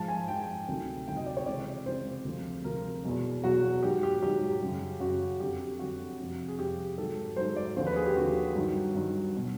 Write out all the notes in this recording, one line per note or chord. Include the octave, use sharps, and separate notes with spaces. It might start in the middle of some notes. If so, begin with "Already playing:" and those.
Already playing: G#2 F3 A5
G#5
G#2 F3 G5
D2 C3 D#3 F#3
D2 C3 D#3 F#3 G5
D#5
D5
C#5
C#2 C3 E3 D5
C#2 C3 E3 C5
D2 C3 F3
D2 C3 F3 A#4
E2 B2 F#3
E2 B2 F#3 F#4
G#2 D#3 F#3 G4
G4
G#2 D#3 F#3 G4
F#2 C#3 F#3
F#2 C#3 F#3 F#4
F2 D3 F#3 G4
F2 D3 F#3 F#4
F2 C3 F3
G#4
F2 C3 F3 G4
G#2 D#3 F#3 A4
G#2 D#3 F#3 C5
D5
D#2 D3 F3 C5
B4
G#4
G4
D#2 D3 F3 F#4
G2 D#3 F#3
G2 D#3 F#3
B2 F#3